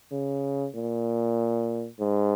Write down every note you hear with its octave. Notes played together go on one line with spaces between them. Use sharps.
C#3
A#2
G#2